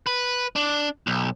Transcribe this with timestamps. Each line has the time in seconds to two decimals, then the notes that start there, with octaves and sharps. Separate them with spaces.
0.07 B4
0.56 D4
1.07 B1